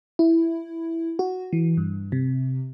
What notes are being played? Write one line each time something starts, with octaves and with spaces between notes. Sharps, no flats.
E4
F#4
E3
G2
C3